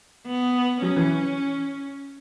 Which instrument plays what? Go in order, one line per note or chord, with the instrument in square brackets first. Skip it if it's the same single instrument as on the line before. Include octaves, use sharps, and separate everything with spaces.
[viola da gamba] B3
[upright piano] F#3 [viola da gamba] C#4
[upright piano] E3